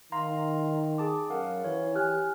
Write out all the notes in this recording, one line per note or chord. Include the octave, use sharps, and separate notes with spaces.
D#3 F5 A#5 C6
G#4 A5 D6
F#2 A#4 F5 F#5
E3 C#5
G4 G#5 F6 F#6